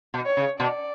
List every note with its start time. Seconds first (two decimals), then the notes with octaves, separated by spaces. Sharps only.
0.14 B2
0.26 C#5
0.37 C#3
0.60 B2 D5